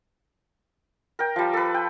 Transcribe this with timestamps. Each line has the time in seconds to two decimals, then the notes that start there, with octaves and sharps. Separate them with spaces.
1.19 A#4 G5
1.36 F3 G3
1.53 A4 B4
1.74 G5